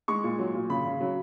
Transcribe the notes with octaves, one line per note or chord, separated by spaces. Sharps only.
G#3 C#6
A#2
F#3
A#2
C#3 B5
C#3
F#3